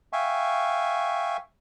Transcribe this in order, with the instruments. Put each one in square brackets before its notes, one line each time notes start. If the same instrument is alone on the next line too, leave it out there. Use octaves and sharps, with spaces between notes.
[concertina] E5 F5 G5 G#5 C#6